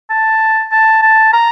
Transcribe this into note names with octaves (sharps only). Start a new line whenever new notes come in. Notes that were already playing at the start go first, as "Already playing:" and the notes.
A5
A5
A5
A#5